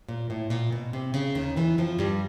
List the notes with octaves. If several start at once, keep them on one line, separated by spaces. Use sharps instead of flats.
A#2
A2
A#2
B2
C3
C#3
D#2 D#3
E2 E3
F2 F3
G2 G3